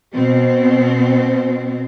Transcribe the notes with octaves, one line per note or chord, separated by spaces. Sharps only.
B2 C4